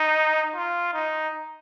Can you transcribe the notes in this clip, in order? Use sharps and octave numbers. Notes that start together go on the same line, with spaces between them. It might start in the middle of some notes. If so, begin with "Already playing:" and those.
Already playing: D#4
F4
D#4